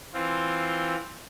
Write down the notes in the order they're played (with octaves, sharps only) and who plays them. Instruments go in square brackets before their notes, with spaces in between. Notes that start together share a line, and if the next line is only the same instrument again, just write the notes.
[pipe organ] E3 C4 F4